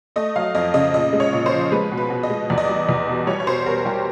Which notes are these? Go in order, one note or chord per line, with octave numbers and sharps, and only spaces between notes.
A3 D#5
F#3 F5
F2 D#5
C#3 D#5
A#2 D#5
G#3
C#5
A#2
C5
F3
G#3 B4
B2
B4
B2
D#5
G#3
E2 D5
D#5
G3 D5
E2
B2
G3 C#5
C#5
B2 C5
B2 A#4
G3 G4